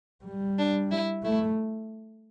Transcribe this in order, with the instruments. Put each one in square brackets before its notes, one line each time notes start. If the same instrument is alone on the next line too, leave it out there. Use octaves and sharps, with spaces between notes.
[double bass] G3
[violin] D4
E4
[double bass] A3 [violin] E4